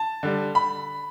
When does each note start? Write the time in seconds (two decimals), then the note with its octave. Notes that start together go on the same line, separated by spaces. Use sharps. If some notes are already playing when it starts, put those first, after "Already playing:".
Already playing: A5
0.23 D3 G3
0.55 B5